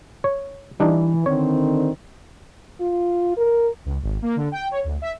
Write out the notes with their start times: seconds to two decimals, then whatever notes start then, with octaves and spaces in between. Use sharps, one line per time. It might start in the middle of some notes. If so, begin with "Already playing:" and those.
0.24 C#5
0.80 E3 G3 D4 D#4
1.26 D3 D#3 C4 C#5
2.80 F4
3.37 A#4
3.85 C#2
4.03 G#1
4.22 A#3
4.36 D3
4.52 G5
4.71 C#5
4.84 D2
5.02 E5